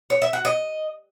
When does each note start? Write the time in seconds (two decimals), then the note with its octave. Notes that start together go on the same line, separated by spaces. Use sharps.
0.10 C#5
0.22 E5
0.33 F#4
0.45 D#5